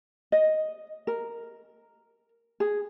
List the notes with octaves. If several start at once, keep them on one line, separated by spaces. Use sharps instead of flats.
D#5
A#4
G#4